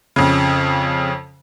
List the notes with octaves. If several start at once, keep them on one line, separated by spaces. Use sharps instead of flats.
F2 C#3